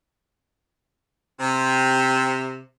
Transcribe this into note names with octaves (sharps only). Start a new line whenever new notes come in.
C3